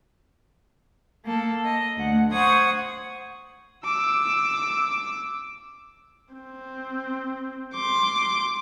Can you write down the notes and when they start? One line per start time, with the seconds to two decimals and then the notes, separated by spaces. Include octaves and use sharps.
1.25 A#3 A4
1.65 D#5
1.96 D2 F#5
2.32 C5 F#5 C#6 D#6 G#6
3.84 D6 E6
6.34 C4
7.74 C6 D6